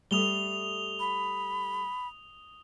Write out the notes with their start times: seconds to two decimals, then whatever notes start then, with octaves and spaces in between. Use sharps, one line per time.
0.11 G3 A3 D#6 F7 G7
1.00 B5